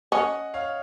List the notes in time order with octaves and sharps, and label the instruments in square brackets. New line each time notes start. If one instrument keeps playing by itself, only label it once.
[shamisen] C#4 [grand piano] D#5 F#5
[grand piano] C#5 F5